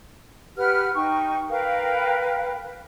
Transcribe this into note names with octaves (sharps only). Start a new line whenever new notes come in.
G4 B4 F#5 F6
D#4 G5 C#6
A#4 B4 F5 G5